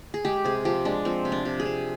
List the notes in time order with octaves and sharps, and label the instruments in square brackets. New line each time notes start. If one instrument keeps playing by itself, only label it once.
[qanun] G#4
G#3 G4
C3 G#4
F3 G4
G#3 D4
F3 C4
C3
D4
C3
G#4
C3